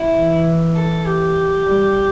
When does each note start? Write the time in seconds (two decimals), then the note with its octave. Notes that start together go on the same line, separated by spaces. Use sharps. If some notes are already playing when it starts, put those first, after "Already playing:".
Already playing: E4
0.16 E3
0.76 A4
1.05 G4
1.66 G3